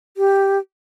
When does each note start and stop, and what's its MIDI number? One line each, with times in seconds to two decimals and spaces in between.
0.17 0.58 67